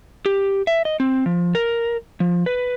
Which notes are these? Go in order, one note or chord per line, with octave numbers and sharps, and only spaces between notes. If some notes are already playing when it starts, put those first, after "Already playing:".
G4
E5
D#5
C4
F3
A#4
F3
B4